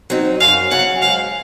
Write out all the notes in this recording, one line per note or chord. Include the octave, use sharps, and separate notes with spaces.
F#3 C4 D#4
F#2 F5
C#3 F#3 C#4 F#5
G#2 F5